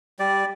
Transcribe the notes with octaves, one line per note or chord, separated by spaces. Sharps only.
G3 D5